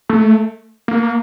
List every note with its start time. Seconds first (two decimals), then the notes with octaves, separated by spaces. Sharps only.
0.09 A3
0.88 A#3